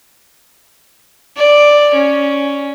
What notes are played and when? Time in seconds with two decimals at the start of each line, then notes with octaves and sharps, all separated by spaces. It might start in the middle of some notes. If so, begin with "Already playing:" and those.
1.37 D5
1.94 C#4